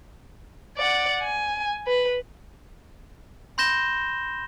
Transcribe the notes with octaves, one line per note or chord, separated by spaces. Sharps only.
D5 F#5
G#5
B4
B5 C6 G6 A#6 E7 G7